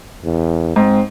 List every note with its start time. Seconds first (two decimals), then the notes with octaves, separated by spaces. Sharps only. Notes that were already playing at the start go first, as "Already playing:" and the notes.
0.24 E2
0.76 G#2 C4